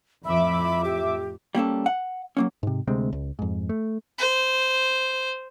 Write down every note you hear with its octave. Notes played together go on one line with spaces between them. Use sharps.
F2 A2 F3 E5 B5 D6
G4
G3 A#3 C#4 A4
F#5
F#3 A#3 C#4
G#2 C3
D2 C3 G#3 C4
C#2
F2 G#2
A3
C5